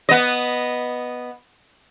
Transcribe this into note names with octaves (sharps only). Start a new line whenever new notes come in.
B3 D#5